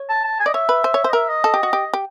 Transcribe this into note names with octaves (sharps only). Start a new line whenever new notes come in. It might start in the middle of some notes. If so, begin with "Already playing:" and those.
Already playing: C#5
A5
A5
G#5
D5 D#5
C#5 E5
B4
C5
C#5
C5
D#5
A#4 E5
D#5
A4
G4
F#4
G4
G4